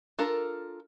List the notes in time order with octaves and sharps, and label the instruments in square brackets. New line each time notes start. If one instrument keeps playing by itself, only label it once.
[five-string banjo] D4 F4 A4 A#4